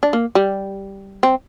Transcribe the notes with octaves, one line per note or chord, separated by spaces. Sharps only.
D4
A#3
G3
C4